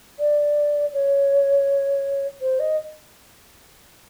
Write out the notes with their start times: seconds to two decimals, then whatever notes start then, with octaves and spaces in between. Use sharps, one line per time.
0.19 D5
0.93 C#5
2.41 C5
2.59 D#5